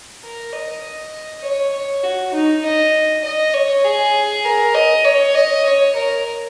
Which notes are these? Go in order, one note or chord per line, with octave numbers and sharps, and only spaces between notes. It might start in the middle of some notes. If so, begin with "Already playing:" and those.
A#4
D#5
C#5
C#5
F#4
D#4
D#5
D#5
C#5
G#4
A#4
D#5
C#5
D#5
C#5
A#4